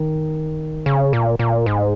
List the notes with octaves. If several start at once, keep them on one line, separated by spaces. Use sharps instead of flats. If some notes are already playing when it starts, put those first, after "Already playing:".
Already playing: D#3
C#3
A#2
A#2
G#2